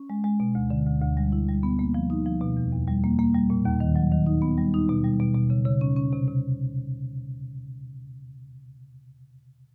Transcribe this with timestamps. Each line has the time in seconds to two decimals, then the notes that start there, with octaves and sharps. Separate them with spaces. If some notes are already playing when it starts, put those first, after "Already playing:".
Already playing: C#4
0.10 G#3
0.24 G#3
0.40 B2
0.55 D2
0.70 D3
0.86 D2
1.02 D2
1.17 G3
1.32 E4
1.49 G3
1.63 B3
1.79 A#3
1.94 F3
2.10 D#4
2.26 F3
2.41 B2
2.57 E2
2.72 E2
2.88 G3
3.04 A#3
3.19 A#3
3.35 G3
3.50 A#2
3.65 D#2
3.80 D#3
3.96 F#3
4.12 D#3
4.26 D#4
4.42 B3
4.58 G3
4.74 D#4
4.89 B2
5.04 G3
5.20 B2
5.35 B2
5.50 C#3
5.65 C#3
5.81 C#4
5.96 C#4
6.13 C3
6.28 C3